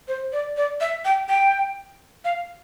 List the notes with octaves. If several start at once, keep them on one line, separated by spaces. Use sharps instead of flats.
C5
D5
D5
E5
G5
G5
F5